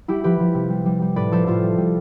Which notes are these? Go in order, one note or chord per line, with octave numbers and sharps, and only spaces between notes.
G3 E4 G4
F3 G4 B4
F3
C3
G3
G3
G3
A2 B4 D5
F3 A4 C5
A2 F4 A4
G3
G3